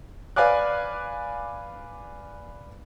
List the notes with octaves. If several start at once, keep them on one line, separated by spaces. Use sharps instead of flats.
B4 D5 F5 G#5 D6 F#6